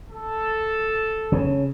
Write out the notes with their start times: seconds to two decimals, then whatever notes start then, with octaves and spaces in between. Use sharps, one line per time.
0.11 A4
1.32 C#3